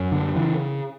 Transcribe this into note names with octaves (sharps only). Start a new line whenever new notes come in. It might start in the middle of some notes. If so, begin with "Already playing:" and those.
Already playing: F#2
D3
C#3 E3